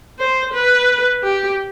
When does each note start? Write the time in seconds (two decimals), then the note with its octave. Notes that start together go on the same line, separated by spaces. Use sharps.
0.19 C5
0.53 B4
1.23 G4